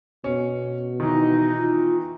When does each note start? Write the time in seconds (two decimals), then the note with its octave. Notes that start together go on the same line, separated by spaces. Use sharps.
0.24 B2 C#4
1.00 D#3 E3 D#4
1.58 F4